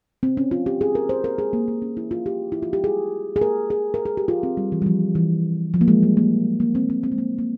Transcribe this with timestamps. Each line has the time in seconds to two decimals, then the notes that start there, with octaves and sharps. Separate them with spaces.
0.23 C4
0.37 C#4
0.51 F4
0.66 G4
0.81 G#4
0.95 A#4
1.09 C5
1.24 A#4
1.38 G#4
1.53 A#3
1.68 A#3
1.82 C#4
1.97 E4
2.11 F4
2.26 G4
2.52 E4
2.63 F4
2.73 G4
2.84 G#4
3.36 G#4
3.41 A#4
3.70 G#4
3.94 A#4
4.06 G#4
4.17 G4
4.28 F4
4.43 C4
4.57 G3
4.72 E3
4.82 G3
4.86 F3
5.15 E3
5.74 F3
5.81 A#3
5.88 G#3
6.03 G3
6.17 A#3
6.60 A#3
6.75 C4
6.90 C4
7.03 C4
7.12 G#3
7.18 A#3
7.39 A#3